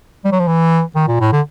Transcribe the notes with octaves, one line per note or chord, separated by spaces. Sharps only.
G3
F#3
F3
E3
D#3
A#2
A2
D3